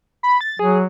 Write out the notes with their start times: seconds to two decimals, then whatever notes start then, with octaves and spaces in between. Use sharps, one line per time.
0.23 B5
0.41 A6
0.59 F#3 G#4